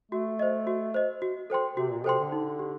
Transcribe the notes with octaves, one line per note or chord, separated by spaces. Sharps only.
A3 F#4
C5 D#5
F#4
C5 D#5
F#4
A4 C5 G5 C6
C3 F#4
A#2
C3 A4 C5 G5 C6
D3
D#4
G4